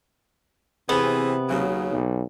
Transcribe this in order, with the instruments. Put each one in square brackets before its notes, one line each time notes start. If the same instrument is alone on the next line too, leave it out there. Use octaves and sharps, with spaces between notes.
[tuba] C3 [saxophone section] E3 C4 G#4 [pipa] B3
[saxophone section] D#2 C#3 F#3
[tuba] B1